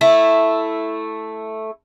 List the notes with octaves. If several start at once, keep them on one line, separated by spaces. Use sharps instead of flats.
A3 E4